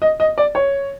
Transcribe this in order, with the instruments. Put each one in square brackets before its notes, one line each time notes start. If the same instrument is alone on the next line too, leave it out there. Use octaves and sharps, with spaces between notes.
[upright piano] D#5
D#5
D5
C#5